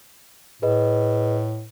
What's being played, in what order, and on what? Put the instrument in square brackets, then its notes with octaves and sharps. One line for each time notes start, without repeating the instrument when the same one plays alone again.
[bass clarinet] A2 [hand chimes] G#4 B4 D#5